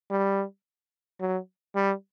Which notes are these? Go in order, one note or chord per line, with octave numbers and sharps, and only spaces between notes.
G3
F#3
G3